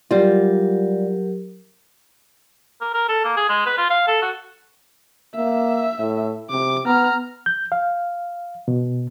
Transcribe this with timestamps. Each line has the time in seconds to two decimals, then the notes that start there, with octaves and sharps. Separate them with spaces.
0.11 F#3 G3 F4 G4 A#4
2.81 A#4
2.94 A#4
3.09 A4
3.24 A#3
3.37 G#4
3.49 G#3
3.66 B4
3.78 F4
3.90 F5
4.08 A4
4.22 F#4
5.35 A#3 E5
5.99 A2
6.50 C3 D6
6.85 B3 A#5 F6
7.46 G6
7.72 F5
8.68 B2